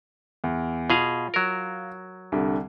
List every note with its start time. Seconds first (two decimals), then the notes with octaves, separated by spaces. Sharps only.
0.44 E2
0.90 B2 F4 G#4 F5
1.34 F#3 A#4
2.32 C2 D3 G3